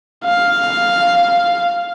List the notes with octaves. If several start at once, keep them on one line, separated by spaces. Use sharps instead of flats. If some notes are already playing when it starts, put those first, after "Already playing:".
F5